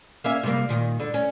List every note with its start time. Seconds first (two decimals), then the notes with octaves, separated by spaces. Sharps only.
0.24 A#3 C#4 E5
0.43 C3 G3 A#3
0.69 A#2 D#3
1.00 D3
1.14 C#4